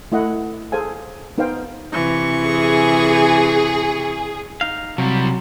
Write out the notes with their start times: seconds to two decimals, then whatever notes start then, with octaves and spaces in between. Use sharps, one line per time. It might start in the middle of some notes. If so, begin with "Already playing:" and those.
0.12 A3 E4 D#5 F#5
0.72 G#4 A4 C5 F5 G#5
1.38 B3 D#4 A#4 C5 F5 G5
1.92 C3 E3 C#6
2.46 G#4
4.61 D#4 F5
4.98 C3 F#3 G3